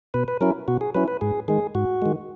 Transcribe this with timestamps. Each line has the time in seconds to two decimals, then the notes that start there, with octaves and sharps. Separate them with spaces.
0.14 B2 B4
0.28 B4
0.41 F#3 C#4 E4 A#4
0.68 B2 F#4
0.81 G#4
0.95 F#3 C#4 E4 B4
1.08 B4
1.21 G#2 G#4
1.48 D#3 G#3 G#4
1.75 G#2 F#4
2.02 D#3 G#3